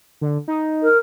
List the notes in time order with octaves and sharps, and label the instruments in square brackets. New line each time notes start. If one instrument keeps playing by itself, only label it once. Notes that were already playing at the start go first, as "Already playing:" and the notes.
[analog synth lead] D3
D#4
[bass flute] A#4